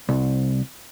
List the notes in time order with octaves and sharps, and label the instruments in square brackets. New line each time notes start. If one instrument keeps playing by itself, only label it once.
[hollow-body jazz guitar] C2